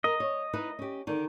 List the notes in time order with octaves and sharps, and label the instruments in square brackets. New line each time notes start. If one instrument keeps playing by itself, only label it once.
[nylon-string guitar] A#4 [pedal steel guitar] D#5
[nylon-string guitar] C#5
D#4 E4 B4
C#4 G4
D3 D#3